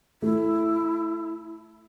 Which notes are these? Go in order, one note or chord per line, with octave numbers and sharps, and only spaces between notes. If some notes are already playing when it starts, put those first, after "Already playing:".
A3 E4